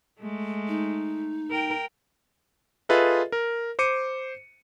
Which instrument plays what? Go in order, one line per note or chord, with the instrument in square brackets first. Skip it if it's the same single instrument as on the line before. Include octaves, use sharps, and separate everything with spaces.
[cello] G#3 A3
[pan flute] D#4
[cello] A#4 G5
[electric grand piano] F4 G#4 A4 B4 D#5 E5
A#4
C5 D6 C#7 D#7